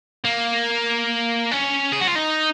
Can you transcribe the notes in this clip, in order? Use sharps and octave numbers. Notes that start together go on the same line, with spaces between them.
A#3
C#4
G#4
F#4
F4
D#4